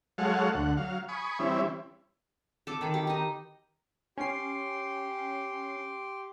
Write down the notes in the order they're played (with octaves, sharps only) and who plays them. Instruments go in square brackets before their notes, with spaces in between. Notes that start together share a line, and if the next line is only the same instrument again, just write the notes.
[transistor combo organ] F#3 G#3 A4 C#5 F5 F#5
D2 F#5
F#3 F5
G#5 B5 C#6 D#6
E3 G3 C4 C#4 E4
[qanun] A4 D6
D#3 B5 D6
G4
D#4 D#5
[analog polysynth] C#4 C7 [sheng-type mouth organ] G4 G5 C6